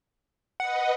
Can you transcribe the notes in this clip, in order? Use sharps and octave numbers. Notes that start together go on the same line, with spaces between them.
B4 D#5 F#5